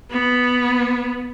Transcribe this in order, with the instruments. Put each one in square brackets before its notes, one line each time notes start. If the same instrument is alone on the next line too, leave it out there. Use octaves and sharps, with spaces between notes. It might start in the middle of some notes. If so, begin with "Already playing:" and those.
[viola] B3